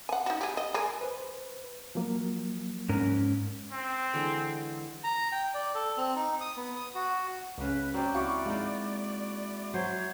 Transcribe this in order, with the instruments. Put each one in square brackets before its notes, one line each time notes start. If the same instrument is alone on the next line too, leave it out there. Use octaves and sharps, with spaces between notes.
[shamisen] F#5 G#5
D#4 F#4
G4 G#4
D#5
G#3 G#4 A#4
[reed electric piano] B4 C5
F3 F#3 A#3
[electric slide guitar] G#2 C#4 A#4
[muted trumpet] C4
[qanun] D3 E3 G#3
[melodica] A#5
G5
D5
A4
C4
D#4
D#6
B3
D#6
F#4
[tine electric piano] C#2 [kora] C#3 A#3 [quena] B4
[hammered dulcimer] F#3 [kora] A#3 C4 G4 [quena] D5
[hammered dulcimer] E4 F#4 F#5 [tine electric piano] F5 C#6 D6
[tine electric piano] G#3 [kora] A#3 D#4
[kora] F#3 C5 [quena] G#6